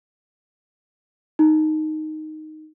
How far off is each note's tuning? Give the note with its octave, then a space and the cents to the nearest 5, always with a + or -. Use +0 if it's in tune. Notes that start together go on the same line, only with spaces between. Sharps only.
D#4 -5